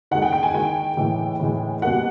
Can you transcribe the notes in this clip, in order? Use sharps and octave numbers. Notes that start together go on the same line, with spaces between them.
D#3 G#3 F#5
G5
G5
G#5
D#3 G#3 G5
A2 E3 G#3
A2 E3 G#3
B2 G3 A#3 F#5